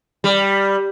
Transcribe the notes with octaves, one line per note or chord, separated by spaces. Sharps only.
G3